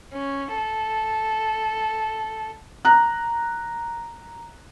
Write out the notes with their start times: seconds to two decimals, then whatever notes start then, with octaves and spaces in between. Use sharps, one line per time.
0.13 C#4
0.56 A4
2.85 A#5 F#6